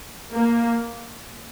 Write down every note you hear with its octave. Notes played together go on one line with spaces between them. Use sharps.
A#3